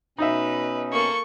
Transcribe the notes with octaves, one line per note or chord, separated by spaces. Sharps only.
B2 C#4 D#4 B4 D#5 E5
A#3 A4 C#6